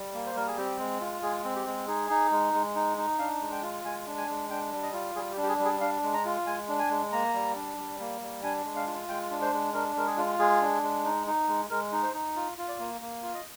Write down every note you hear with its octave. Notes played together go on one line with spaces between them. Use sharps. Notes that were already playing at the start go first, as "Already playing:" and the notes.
Already playing: G3
A#3
C5
G3 A#4
G#4
C4 G4
G#3
F4
G#3 G#4
C4
G4
G#3
D#4 G#4
D#4
G#3
G#3
D#4
D#4
D4 F5
G#3
G5
F4
G#3 G#5
D4
G#5
G#3
D4 G5
G3
D#5
F4
G3 G#4
G4
D4
G4
G#4
G3
G#4
D4 F5
G#3
A#5
F4
G#3 G#5
D4
G#5
G#3
A#3 A#5
G3
D4
G3
A#3
G3
D4 G#5
G#3
F5
F4
G#3 G5
D4
C5
G#3
D4 A#4
G#3 A#4
G#4
F4
G#3 G#4
D4
G#3
D#4
D#4
G#3
G#3 A#4
D#4
C5
D#4
F4
F4
D5
A#3
A#3
F4
D#5